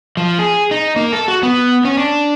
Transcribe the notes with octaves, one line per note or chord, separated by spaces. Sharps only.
F3
G#4
D#4
A#3
A4
F#4
B3
C#4
D4